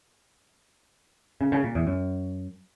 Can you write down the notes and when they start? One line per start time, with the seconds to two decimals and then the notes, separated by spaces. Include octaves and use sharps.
1.41 C#3
1.52 C#3
1.64 A#2
1.75 E2
1.87 F#2